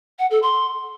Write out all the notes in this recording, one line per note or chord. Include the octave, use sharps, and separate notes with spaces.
F#5
A4
C6